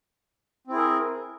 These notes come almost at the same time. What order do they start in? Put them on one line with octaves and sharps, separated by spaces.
C4 E4 G#4 A#4